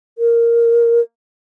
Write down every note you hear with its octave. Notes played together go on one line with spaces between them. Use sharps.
A#4